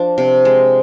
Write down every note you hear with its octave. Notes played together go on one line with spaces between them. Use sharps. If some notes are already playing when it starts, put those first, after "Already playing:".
Already playing: F3 D4
C3
G#3